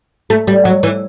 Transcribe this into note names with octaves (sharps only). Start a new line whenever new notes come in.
A3
G3
F#3
E3